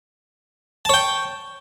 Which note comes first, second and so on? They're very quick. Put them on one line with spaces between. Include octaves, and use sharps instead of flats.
A5 C#5 G5